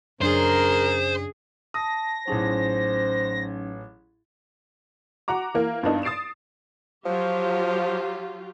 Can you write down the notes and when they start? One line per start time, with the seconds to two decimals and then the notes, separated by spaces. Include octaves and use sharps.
0.21 F#2 C#3 D4 G#4 A#4 C5
1.74 A5 D#6 A#6
2.27 A1 F#3 C#4 D#4 G#4 C5 A5
5.28 F#4 F#5 A#5 D6
5.54 E3 A#3 A#4
5.83 G2 B3 D4 D#4
6.03 D#6 A6 C7 D7 E7
7.05 F3 F#3 F4 G4